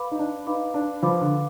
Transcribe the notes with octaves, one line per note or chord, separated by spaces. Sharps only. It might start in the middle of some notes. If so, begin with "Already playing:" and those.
Already playing: B4 F5 B5 D6
D#4
D4
D#4 B4 F5 B5 D6
D4
F3 B4 F5 B5 D6
D3